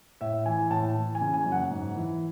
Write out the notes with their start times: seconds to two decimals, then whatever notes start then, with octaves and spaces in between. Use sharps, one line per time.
0.21 A2 E5
0.46 E3 G#5
0.70 A2 A5
0.96 E3
1.15 G#5
1.21 C#3
1.34 G#5
1.46 F#2
1.52 F#5
1.70 G#2
1.96 E3